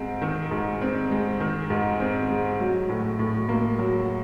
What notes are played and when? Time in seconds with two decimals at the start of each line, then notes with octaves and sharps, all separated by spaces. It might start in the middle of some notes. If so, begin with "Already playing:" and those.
Already playing: G#2 G#3 C4
0.22 D#3
0.51 G#2
0.81 C4
1.11 G#3
1.40 D#3
1.70 G#2
2.00 C4
2.30 G#3
2.60 F#3
2.89 A2
3.19 A2
3.49 A#3
3.79 F#3